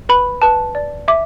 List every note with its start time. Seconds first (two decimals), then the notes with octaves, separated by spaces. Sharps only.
0.09 B4 B5
0.42 B4 A5
0.75 D5
1.08 E5 D6